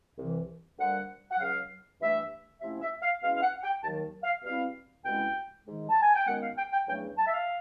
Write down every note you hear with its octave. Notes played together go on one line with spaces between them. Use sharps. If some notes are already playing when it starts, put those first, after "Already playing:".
C2 C3 E3
D2 D3 G3 A#3 F#5
F#5
C#2 C#3 F#3 F5
G2 E3 A3 E5
C3 F3 A3 C#4 E4 E5
E5
F5
B2 G#3 C#4 E4 F5
F5
F#5
G5
D#2 D#3 F#3 A5
F5
B2 G3 C4 E4 F5
C2 B2 G#3 C#4 E4 G5
G#2 D#3 G#3
A5
G#5
G5
F#2 D#3 G#3 B3 F#5
F5
G5
G5
E2 C#3 F#3 A3 D4 G5
A5
E5
F5